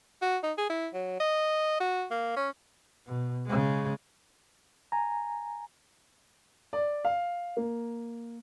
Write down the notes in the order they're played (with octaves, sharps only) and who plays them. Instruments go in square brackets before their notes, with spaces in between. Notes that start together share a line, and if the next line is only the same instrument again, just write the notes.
[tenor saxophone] F#4
D#4
G#4
E4
F#3
D#5
F#4
A#3
C#4
[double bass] B2
C#3 G#3
[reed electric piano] G#5 A#5
[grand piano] D5
F5
A#3